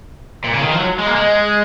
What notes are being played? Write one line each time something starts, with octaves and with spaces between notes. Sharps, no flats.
A#2
C#3
D#3
F3
F#3
G#3
A#3
G#3